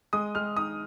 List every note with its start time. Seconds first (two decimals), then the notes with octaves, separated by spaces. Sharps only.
0.13 G#3 D#6
0.35 G#3 F6
0.56 D#4 D#6